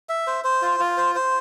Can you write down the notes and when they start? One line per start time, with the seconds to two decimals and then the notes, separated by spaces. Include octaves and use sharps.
0.09 E5
0.27 C5
0.44 C5
0.62 F4
0.80 F4
0.97 C5
1.15 C5